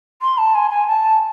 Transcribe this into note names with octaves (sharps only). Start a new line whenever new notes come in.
C6
A5
G#5
G#5
A5